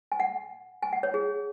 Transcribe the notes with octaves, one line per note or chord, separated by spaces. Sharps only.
G#5
F#5
G#5
F#5
C#5
G#4